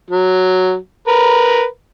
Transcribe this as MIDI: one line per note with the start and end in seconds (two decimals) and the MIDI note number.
0.10 0.76 54
1.08 1.64 70
1.08 1.64 71